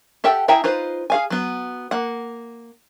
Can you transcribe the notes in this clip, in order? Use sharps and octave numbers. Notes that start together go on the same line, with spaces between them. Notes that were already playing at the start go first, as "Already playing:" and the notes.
G4 A4 E5 F#5 G5
E4 G#4 E5 G5 A#5
D#4 F4 B4 C5
G#4 F5 G#5
F#3 B3
A#3 F#5